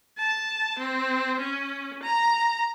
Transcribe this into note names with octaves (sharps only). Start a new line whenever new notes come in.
A5
C4
C#4
A#5